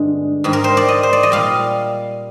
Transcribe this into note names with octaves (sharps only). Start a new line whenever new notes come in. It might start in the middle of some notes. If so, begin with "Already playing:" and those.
Already playing: G2 D3 G#3
G#2 D#3 G3
A#4
C5
D5
D#5
C5
D5
D#5
A#2 G3 F5